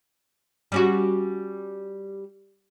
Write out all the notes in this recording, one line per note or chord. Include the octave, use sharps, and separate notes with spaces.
G3 C#4 F#4